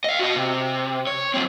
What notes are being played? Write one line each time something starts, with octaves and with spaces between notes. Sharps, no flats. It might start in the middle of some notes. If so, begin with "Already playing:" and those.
D#5 F5
F#4 D#5
C3
C#5
F#3 C4